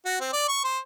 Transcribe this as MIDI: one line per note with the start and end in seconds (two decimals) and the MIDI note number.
0.05 0.19 66
0.20 0.30 60
0.33 0.45 74
0.49 0.60 85
0.64 0.79 72